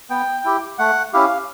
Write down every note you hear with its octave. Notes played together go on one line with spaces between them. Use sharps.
B3 G5
E4 G4
A3 F#5
C#4 E4 G4 F5